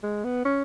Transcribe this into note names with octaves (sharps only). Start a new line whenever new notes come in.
G#3
B3
C#4